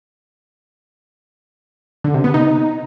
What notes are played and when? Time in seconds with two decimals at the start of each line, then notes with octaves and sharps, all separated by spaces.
2.04 D3
2.14 C3
2.24 B3
2.34 D#4